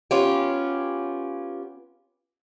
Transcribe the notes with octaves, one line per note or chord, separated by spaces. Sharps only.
B3 C#4 F4 G4